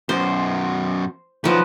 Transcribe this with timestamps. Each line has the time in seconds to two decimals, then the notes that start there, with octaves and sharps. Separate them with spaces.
0.09 F#2 B2 C5
1.44 D#3 F3 F#3 B4